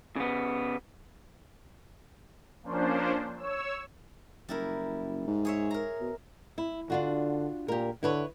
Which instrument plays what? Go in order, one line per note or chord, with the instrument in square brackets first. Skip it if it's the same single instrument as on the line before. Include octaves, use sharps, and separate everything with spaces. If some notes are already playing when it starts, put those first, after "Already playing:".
[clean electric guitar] C#3 B3
[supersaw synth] F3 A#3 C#4 D4 C5
C#5 E6
[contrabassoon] F#1 [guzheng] G3 E4 A#4
[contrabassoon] G#2
[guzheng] G#4 C#5 E5
A#4 A#5
[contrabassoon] B2
[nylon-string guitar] E4
[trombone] D3 [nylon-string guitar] D4 F4 F#4
[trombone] A#2 [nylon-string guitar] G4 A#4
[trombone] D3 [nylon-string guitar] E4 B4 C#5